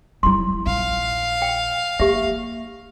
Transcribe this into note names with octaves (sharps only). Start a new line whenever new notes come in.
F#3 G3 E4 C6
A#1 F5
G5
A#3 G4 E5